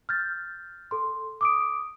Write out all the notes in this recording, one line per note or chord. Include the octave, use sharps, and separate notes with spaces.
F6 G6 A6
A4 C6
D6 D#6 D7